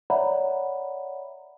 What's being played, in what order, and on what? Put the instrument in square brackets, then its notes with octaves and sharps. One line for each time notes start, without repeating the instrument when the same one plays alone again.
[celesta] C#5 D5 E5 F#5 A#5 B5